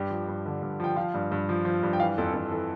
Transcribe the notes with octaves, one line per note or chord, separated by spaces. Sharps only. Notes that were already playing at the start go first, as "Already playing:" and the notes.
Already playing: G2 G4
F3
G2
D3
G2
F3 G5
F3 F5
G2
G2
F3
F3
G2
G5
E3 F5
F2 A4
F2 A4
E3 A4